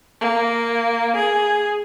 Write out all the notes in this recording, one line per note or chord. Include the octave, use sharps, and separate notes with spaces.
A#3
G#4